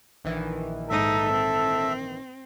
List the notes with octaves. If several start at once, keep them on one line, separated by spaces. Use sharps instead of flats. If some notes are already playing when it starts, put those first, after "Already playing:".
A#1 D#3 E3
G#2 D#4 A4 E5
C4